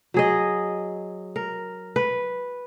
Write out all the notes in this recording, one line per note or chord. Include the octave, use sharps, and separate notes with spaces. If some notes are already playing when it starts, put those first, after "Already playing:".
F#3 G#4 D#5
A#4
B4